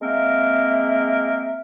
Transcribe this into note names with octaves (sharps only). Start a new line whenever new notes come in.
G#3 A#3 C4 A#4 E5